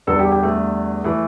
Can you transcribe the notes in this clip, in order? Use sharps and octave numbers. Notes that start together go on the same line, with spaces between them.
E2 D3 G3 A4
G4
G4
A3
E3 A3